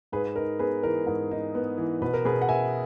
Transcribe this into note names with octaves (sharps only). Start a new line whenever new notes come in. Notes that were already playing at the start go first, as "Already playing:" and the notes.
G#2 G#4 B4
D#4 A#4
B3 G#4 B4
E3 A#4
G#2 A#4
D#4
B3
E3
B2 B4
A#4
B2 G#4 B4
F#5
B3 E5 G#5